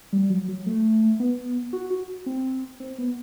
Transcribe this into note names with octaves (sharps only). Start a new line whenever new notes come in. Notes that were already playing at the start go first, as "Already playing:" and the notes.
G3
F#3
F#3
A3
B3
F#4
F#4
C4
C4
B3